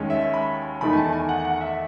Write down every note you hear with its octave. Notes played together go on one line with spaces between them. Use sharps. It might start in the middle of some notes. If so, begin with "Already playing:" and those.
Already playing: D#2 D#3 G#3 C#4
E5
B5
E2 D#3 A3 D#4 B5
G#5
A5
G#5
F#5
F#5
E5